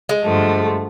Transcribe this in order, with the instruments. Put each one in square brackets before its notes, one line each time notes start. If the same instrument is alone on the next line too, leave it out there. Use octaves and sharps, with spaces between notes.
[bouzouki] G#3
[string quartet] G2 D3 F3 A3